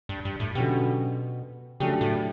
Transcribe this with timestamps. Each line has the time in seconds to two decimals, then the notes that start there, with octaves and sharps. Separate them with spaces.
0.09 G2
0.25 G2
0.40 A2
0.55 B2 D3 F#3 C#4 G4
1.80 C#3 F#3 A3 D4 G4
2.01 A2